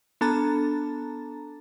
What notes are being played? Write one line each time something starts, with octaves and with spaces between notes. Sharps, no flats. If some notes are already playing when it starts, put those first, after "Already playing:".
B3 D4 A4 A5 A#5 A6